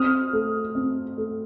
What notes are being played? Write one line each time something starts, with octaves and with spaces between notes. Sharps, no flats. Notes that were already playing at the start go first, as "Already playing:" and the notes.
Already playing: C4 D#6 F6
A3
C4
A3